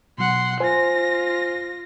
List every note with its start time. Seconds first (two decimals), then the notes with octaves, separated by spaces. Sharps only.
0.18 B2 F#3 F#5 C6
0.60 F4 C5 G#5 A#6